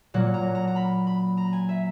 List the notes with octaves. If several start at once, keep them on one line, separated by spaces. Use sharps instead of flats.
A#2 F#3 A#3 F#5
A#5
A#5
A#5
B5
B5
A#5
G#5
E5